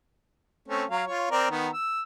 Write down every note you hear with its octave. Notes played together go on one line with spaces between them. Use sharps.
A3 C4 C#4
F#3 F5
F4 C#5
C4 A#4 D5
D#3 B3 A#5
E6